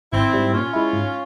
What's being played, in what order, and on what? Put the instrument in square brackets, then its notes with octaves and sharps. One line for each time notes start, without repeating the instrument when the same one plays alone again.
[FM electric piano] G#1 [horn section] C4 E4
[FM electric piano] G#2 G3
[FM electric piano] A#2 [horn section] C#4 F4
[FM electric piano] G#3 E4
G#2